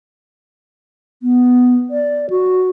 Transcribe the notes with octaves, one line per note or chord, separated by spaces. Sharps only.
B3
D5
F#4